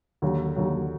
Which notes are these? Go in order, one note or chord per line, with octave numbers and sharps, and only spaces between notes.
D#2 D3 F#3
D#2 D3 F#3